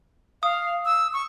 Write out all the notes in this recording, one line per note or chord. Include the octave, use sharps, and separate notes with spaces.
F5 D#6
E6
C#6